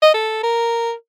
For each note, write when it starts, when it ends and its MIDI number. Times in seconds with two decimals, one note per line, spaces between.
0.02 0.09 75
0.14 0.39 69
0.43 0.93 70